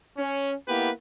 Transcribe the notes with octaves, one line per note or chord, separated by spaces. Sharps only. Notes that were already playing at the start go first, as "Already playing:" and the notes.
C#4
A#3 B3 E4 G4 B4